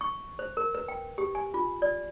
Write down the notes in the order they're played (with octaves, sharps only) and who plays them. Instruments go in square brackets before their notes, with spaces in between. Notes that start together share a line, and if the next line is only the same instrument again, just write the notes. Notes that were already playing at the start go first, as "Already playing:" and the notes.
[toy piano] C#6
C5
A#4
B4
G5
G4
G#5
F4
D5